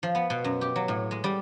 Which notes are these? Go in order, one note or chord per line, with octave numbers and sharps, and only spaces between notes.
F3
B3
B2
F#2
G4
F#3
A2
G#3
G3